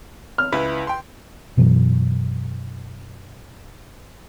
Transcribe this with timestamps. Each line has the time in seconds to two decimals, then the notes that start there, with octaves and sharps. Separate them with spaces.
0.38 F6
0.52 C#2 E4 B4
0.87 G5 C6
1.57 F#2 B2 E3 F#3